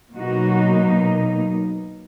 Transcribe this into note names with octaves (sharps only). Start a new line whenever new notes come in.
B2 F#3 A#3 D#4 F#4